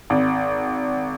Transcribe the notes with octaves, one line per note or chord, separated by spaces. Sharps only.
G#1